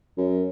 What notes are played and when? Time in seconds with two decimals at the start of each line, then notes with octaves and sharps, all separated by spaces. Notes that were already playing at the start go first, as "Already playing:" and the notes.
0.17 F#2